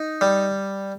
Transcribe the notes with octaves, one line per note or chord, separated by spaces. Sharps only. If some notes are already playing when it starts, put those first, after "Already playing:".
Already playing: D#4
G3